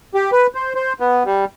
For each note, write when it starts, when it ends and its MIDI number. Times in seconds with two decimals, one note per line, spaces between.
0.14 0.31 67
0.32 0.47 71
0.55 0.73 72
0.75 0.93 72
1.00 1.23 59
1.25 1.45 55